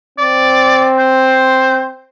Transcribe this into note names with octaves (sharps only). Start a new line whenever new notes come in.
C4 D5
C5